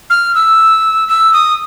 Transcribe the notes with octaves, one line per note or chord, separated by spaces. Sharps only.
F6
E6
E6
D#6